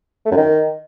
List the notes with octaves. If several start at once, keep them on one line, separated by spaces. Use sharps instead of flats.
A3
F#2
D#3